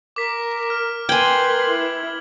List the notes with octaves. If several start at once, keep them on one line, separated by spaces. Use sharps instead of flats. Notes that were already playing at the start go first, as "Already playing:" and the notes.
A#4 D6 B6
F6
A#4 B4 G5 G#5 C6 G#6 F#7 G7
E4